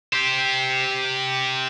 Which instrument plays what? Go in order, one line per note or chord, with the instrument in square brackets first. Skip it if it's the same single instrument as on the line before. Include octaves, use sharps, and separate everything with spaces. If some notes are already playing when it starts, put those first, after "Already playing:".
[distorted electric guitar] G4 C5